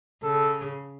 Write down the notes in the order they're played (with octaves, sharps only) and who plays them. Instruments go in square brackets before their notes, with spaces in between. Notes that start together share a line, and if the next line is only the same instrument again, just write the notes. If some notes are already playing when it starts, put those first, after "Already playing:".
[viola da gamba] C#3 [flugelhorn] A4